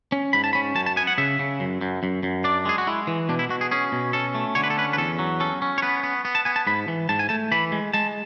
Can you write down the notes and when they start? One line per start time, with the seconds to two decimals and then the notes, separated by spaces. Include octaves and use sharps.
0.12 C#4
0.33 G#2 B5
0.44 A5
0.53 C#4 B5
0.75 F#2 A5
0.86 A5
0.96 B3 G#5
1.07 F#5
1.18 C#3 E5
1.39 C#3
1.60 F#2
1.81 F#2
2.03 F#2
2.23 F#2
2.44 D4 D5
2.65 G#3 G#4
2.78 F#4
2.87 G#3 E4
3.07 E3
3.29 B2 D4
3.39 E4
3.49 B2 F#4
3.61 G#4
3.71 C#4 G#4
3.92 B2
4.13 C#4 A4
4.35 A3
4.55 D3 C#5
4.64 B4
4.70 A4
4.77 C#4 B4
4.93 B4
4.98 E2 A4
5.19 F#3
5.40 C#4 A4
5.62 C#4
5.78 C#5
5.82 B3 B4
6.03 B3
6.25 B3
6.35 A5
6.45 B3 G#5
6.56 A5
6.67 G#2 B5
6.88 E3
7.09 G#2 A5
7.19 G#5
7.29 A3 A5
7.52 E3 B5
7.72 G#3
7.94 G#3 A5